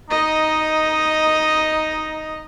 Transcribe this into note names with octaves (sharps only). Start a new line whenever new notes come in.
D#4 D#5